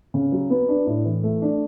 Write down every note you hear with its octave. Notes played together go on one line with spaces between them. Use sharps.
C#3
F#3
B3
D4
A2
E3
A3
D4